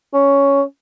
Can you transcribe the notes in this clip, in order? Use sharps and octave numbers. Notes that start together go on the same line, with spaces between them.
C#4